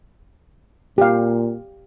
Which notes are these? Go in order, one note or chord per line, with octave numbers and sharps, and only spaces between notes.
A#2 G4 F5